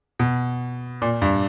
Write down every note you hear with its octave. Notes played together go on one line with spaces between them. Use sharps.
B2
A#2
G2